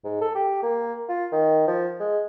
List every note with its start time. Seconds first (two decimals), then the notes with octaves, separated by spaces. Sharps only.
0.04 G#2
0.21 A4
0.35 G4
0.63 A#3
1.09 F4
1.32 D#3
1.68 F3
2.00 G#3